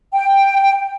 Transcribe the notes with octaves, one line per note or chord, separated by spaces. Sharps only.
G5